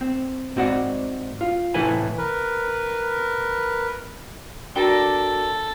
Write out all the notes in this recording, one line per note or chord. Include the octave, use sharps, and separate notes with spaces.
C4
G#2 C4 F#4 D5 F#5
F4
C2 A2 E3 A4 B4 G#5
A#4 B4
D4 F#4 A4 A#4 G5 G7